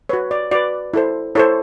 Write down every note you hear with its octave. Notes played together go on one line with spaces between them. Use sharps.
F#4 B4 C#5
D5
F#4 B4 D5
E4 A4 C5
E4 A4 C5 C#5